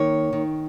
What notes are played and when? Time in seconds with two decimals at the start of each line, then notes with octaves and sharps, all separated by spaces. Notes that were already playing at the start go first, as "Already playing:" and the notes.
Already playing: D#3 A#3 C#5
0.33 D#3